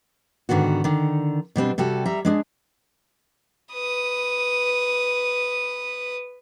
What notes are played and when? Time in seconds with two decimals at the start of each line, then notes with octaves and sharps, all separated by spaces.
0.49 G#2 D3 D#3 B3 F#4
0.84 D3 D#3
1.56 B2 G3 C4 D4
1.78 C3 G3 F#4 A4
2.06 G3 E5 A#5
2.25 G#3 D4 G#4
3.73 B4 D#6